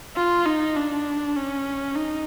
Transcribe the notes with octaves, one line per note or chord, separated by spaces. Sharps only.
F4
D#4
D4
C#4
D#4